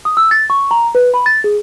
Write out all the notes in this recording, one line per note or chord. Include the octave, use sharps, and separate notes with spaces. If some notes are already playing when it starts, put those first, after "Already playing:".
D#6
E6
A6
C#6
A#5
B4
B5
A6
G#4